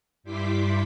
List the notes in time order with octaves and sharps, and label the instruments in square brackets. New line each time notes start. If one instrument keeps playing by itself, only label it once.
[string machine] G2 G3 E4 C6 D6 B6